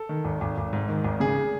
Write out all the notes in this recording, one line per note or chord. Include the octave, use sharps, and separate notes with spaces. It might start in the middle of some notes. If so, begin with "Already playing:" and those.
Already playing: A4
D#3
G#1
G#1
G#1
G#2
D#3
G#1
C#3 G#4